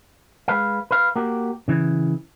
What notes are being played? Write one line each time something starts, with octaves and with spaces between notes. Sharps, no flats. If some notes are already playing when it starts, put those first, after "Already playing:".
G#3 B4 F5
B4 F5
A#3 F#4 G4
C#3 E3